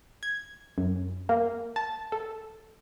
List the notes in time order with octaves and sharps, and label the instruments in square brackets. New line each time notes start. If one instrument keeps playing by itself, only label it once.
[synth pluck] G#6
F#2
A#3
A5
A4